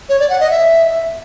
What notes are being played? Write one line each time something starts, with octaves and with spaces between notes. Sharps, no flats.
C#5
D5
F#5
D#5
E5